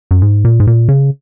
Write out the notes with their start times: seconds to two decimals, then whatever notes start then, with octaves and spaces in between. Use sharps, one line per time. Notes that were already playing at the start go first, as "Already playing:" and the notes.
0.11 F#2
0.22 G#2
0.45 A#2
0.60 G#2
0.67 A#2
0.89 C#3